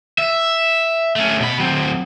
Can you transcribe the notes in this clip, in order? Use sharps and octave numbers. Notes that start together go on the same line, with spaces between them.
E5
A3 C#4
B2 B5
F#3 C4